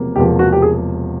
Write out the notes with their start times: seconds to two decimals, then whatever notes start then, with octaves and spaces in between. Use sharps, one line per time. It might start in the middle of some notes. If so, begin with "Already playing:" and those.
Already playing: E1 E2 C3 F3 A#3
0.16 E1 E2 C3 F3 A#3 G4
0.39 F#4
0.52 G4
0.62 G#4